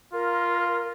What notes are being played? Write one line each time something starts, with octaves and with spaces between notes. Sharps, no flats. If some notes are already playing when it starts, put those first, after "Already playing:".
F4 A#4